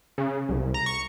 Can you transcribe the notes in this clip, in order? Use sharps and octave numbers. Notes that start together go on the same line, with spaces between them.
C#3
C2
A#5
C#6